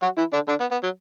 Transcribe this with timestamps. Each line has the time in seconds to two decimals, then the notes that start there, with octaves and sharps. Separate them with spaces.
0.02 F#3 F#4
0.18 E3 E4
0.33 D3 D4
0.48 D3 D4
0.60 B3
0.71 B3
0.83 F#3